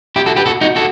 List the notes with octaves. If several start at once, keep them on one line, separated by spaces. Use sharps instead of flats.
E4 G4
F#4 A4
G4 B4
F#4 A4
D#4 F#4
F#4 A4